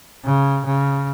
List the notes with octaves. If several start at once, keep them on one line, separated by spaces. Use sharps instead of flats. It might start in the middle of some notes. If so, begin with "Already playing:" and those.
C#3
C#3